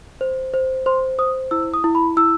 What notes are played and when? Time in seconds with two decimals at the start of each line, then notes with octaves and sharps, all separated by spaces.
0.21 C5
0.54 C5
0.86 C5 C6
1.19 C5 D#6
1.51 E4 E6
1.74 D#6
1.84 E4
1.95 B5
2.17 E4 E6